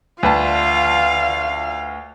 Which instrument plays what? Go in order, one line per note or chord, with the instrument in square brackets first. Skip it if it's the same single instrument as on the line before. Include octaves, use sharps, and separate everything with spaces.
[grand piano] D2 B4 A5 [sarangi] F4 [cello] F5